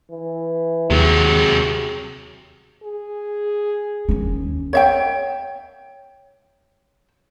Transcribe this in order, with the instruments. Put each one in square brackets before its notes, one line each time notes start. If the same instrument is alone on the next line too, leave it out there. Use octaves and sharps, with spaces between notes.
[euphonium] E3
[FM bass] D#2 [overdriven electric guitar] C3 F#3 [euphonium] G#4
[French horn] G#4
[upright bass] D#2 C#4
[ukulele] C#5 E5 G5